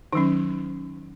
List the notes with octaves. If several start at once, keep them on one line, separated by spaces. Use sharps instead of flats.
D#3 F#3 C#4 D#4